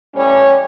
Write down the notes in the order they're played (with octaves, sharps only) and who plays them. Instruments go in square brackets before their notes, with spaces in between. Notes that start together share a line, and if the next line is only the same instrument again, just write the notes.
[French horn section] A2 E3 G3 C#4 C#5